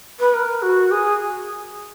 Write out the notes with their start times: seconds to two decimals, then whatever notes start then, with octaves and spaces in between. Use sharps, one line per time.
0.20 B4
0.34 A#4
0.62 F#4
0.91 G#4